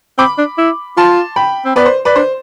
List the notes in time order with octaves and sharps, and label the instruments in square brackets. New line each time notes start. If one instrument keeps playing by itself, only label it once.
[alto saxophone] C4 [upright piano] B5 D6
[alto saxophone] D4
E4
[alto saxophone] F4 [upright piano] A5 C6
[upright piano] G5 B5
[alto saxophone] C4
[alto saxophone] B3 [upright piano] B4 D5
[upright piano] C5
B4 D5
[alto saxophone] D4 [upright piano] C5